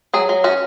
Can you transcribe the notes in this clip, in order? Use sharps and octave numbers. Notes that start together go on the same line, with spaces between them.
F#3 G#4
F#3
C#4 F#4